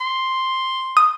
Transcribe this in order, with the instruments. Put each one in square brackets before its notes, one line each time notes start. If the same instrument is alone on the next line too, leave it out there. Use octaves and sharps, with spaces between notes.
[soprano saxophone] C6
[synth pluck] D#6